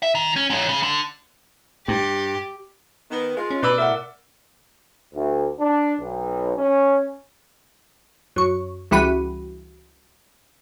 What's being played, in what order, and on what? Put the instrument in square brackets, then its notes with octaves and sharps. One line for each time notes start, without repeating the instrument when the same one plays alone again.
[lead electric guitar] E5
D#3
C#4
G#2 C#4
C#3
D3
[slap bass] G2 [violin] G4
[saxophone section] D#3 B3
G#3 F4
[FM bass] C#4
[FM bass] B2 [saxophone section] D#4 B4 [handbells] D5 D6 E6
[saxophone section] A2 E5 [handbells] A#4 F#5
[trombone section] D2
D4
B1
C#4
[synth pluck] F#2 C#6
C#2 E3 G3 F#4 B5 D#7